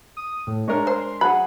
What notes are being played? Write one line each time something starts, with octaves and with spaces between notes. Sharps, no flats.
D#6
A2
G#3 D4 A#4 C#5
C5 C6
F#3 G#4 F#5 B5